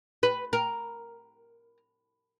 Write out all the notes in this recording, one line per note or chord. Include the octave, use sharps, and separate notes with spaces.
B4
A#4